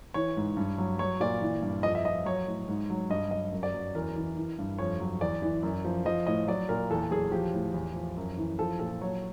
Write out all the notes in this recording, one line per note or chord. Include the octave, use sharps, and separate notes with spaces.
E3 C#5
G#2
G2
F#3
F#3 C#5
A#2 D5
E3
G2
F2 D#5
E5
F3 D#5
F#3 C#5
A2
G#2
F#3
G2 D#5
F#3 D#5
F#2
D5
F#3
E2 A#4
E3
E3
G2
F2 C#5
F#3
E2 D5
E3
F#2
F3
F3 D#5
A2 D#5
F#3 D5
A#2 A#4
E2 A4
F#3 G#4
F3 G4
A2
E2
F3
F#2
E3
F3 A4
A#2 A4
F#3 C#5